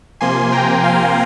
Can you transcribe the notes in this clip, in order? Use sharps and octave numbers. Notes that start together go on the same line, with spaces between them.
C3 F3 A#3 G#5 C6
G5 A#5
F5 G#5